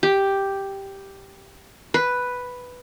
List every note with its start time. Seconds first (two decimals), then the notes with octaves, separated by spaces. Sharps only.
0.03 G4
1.94 B4